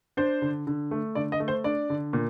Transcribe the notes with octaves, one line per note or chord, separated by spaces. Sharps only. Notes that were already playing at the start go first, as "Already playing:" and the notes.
D4 C5
D3
D3
A3
D3 D5
D#5
A3
C5
D4 D5
D3
A#2